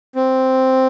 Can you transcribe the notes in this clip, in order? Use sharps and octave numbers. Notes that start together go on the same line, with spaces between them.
C4